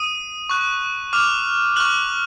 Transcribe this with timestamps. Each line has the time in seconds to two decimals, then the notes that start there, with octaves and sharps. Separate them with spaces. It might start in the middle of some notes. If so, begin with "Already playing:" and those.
Already playing: D#6 D#7
0.50 C#6 F#6
1.13 D6 F6 F7
1.76 C#6 F6 F#6 F#7